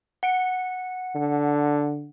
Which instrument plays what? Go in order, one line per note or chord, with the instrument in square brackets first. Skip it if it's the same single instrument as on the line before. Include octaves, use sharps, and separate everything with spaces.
[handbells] F#5 C#7 D7
[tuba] D3